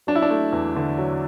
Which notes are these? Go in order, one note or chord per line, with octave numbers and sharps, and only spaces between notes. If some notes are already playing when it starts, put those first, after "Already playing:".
F#3 D4
E4
D4
A3
E2
D3
F#3